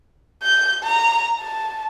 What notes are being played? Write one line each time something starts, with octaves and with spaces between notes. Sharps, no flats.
G6
A#5
A5